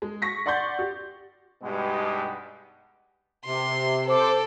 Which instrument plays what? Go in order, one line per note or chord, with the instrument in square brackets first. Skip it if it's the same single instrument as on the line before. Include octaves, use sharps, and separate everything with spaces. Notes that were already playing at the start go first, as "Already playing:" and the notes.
[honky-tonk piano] G#3
C#6 A#6 B6
D5 F#5 C6 C#6 G6 A6
G4
[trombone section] G2 B2 G#3 B3 D#4 G4
[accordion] C3 [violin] C6
[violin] A4 [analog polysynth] C5 D6